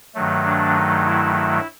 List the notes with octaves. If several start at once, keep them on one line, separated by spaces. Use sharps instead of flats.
G2 D#3 F#3 A3
D4
D#4
E4
E4